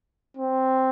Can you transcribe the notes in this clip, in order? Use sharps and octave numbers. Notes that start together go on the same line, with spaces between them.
C4